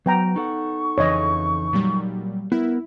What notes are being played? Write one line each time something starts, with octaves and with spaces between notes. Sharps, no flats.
F#3 B3 G5 A#5
D#4 A4 F#5 C#6
F2 C#3 E3 C#5 D#5
A#2 F#3 G3
B3 E4 A#4